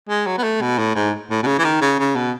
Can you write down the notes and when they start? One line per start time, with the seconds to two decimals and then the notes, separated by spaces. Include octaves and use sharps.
0.09 G#3
0.27 F#3
0.38 B3
0.43 A3
0.61 B2
0.78 A2
0.95 G#2
1.30 A2
1.43 B2
1.47 C#3
1.59 E3
1.65 D#3
1.81 C#3
1.99 C#3
2.16 B2